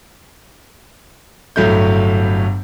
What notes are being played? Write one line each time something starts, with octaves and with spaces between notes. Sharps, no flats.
G1 A2 F#3 A3 G6